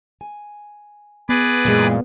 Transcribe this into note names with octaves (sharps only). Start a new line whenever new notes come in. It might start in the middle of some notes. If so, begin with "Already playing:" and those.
G#5
B3 G#4 B4 D5
F#2 A#2 E3 G#3